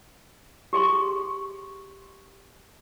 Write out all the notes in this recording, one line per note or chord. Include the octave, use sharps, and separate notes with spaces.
G4 G#4 C6 C#6